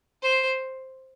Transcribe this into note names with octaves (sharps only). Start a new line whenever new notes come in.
C5